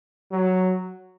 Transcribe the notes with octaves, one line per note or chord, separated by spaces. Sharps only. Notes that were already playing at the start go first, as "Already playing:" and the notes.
F#3